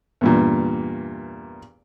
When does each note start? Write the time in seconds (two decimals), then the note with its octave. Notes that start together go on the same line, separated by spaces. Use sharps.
0.21 E2 G2 A#2